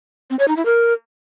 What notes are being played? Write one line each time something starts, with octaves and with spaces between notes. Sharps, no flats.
C4
C#5
D#4
E4
A#4